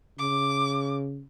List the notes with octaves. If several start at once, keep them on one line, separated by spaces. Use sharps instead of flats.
C#3 D6